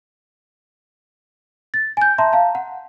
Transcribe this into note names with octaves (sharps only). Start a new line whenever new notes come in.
A6
G#5 G6
E5 A5 A#5 C6
F5 A5 A#5
F#5